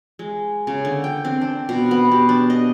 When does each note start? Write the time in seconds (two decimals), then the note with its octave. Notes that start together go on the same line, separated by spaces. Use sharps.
0.19 G#3
0.67 C#3
0.85 D3
1.04 G5
1.25 C4
1.41 D4
1.69 B2
1.91 B3
2.11 G4
2.29 D4
2.50 D#5